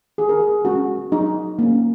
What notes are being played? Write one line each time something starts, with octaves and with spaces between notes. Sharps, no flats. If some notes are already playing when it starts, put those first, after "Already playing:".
D#3 G#4
A#4
G#4
G#3 C#4 F#4
F#3 D#4
A#3 C#4